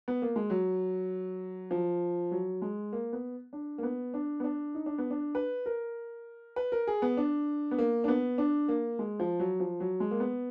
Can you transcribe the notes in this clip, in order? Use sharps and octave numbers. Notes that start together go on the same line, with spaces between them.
B3
A#3
G#3
F#3
F3
F#3
G#3
A#3
B3
D4
A#3
B3
D4
B3
D4
D#4
D4
B3
D4
B4
A#4
B4
A#4
G#4
B3
D4
B3
A#3
D4
B3
D4
A#3
G#3
F3
F#3
F3
F#3
G#3
A#3
B3